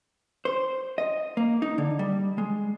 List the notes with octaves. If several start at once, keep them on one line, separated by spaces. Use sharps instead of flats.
C5
D#5
A#3
D#4
D3
G3
G#3